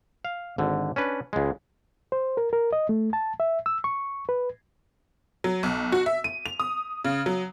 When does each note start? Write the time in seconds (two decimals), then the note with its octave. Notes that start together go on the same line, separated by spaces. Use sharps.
0.25 F5
0.58 G#1 D3
0.96 C#4 D4 B4
1.33 C#2 G#3
2.12 C5
2.37 A#4
2.53 A#4
2.73 D#5
2.89 A3
3.13 A5
3.40 E5
3.66 E6
3.84 C#6
4.29 B4
5.44 F#3
5.63 B1
5.92 F#4
6.06 E5
6.24 D#7
6.46 F7
6.60 D#6
7.05 C#3
7.26 F#3